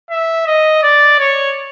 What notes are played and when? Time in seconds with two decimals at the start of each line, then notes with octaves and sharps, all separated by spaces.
0.11 E5
0.47 D#5
0.83 D5
1.19 C#5